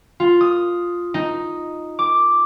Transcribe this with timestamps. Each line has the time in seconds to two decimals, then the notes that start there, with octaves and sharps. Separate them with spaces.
0.20 F4
0.41 D#6
1.14 D#4
1.99 D6